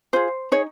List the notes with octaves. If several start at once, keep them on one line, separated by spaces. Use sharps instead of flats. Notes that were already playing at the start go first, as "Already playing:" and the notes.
F4 G#4 C5
D#4 G#4 C#5